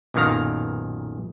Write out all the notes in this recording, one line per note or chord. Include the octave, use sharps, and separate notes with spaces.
B1 F#2 A#2 D#3 F5 A#5